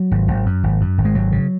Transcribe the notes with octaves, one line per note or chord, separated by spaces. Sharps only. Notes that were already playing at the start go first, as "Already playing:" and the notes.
Already playing: F#3
G#1
G#1
F#2
G#1
F#2
G#1
G#3
G#1 F#3
C#3